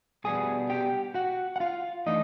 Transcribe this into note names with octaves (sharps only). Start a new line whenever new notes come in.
B2 G3 B3 D4 G#4 G#5
G4 G5
F#4 F#5
F#5
F4 F5
E3 A3 D4 D#4 D#5